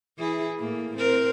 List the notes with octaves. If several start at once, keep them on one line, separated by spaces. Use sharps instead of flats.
E3 E4 G#4
A2 A#3
C4 A#4